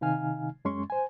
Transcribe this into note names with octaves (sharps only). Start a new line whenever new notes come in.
C3 D#3 D#4 F5 G#5 F6
F#2 G#3 C#4 C6 C#6
C5 G#5